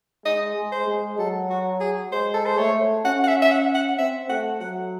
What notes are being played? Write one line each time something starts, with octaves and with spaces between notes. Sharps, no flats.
G#3 D#5
G#3
C5
G#3
F#3 A4
F#4
G#4
G#3 C5
A4
C5
A3 C#5
C#4 F#5
F#5
E5
E5
F#5
F#5
C4 E5
A3 F#5
F#3 F#5